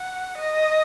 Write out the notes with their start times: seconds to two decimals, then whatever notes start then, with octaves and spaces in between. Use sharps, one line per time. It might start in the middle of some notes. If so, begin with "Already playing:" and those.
Already playing: F#5
0.37 D#5